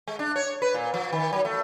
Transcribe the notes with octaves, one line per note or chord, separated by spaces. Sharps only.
G#3
D4
C#5
B4
A#2
F3
D#3
F#3
A3